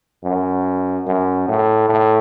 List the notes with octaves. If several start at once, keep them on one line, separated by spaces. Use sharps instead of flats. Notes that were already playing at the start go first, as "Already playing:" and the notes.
F#2
F#2
A2
A2